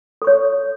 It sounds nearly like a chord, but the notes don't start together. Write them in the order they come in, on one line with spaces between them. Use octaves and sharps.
A4 C#6 C#5